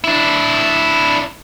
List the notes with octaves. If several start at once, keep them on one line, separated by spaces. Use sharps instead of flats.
D4 E4